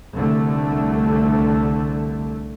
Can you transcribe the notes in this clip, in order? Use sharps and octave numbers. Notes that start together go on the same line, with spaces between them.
C2 D3 A3